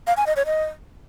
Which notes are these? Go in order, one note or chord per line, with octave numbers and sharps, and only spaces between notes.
F5
G#5
D#5
C#5
D#5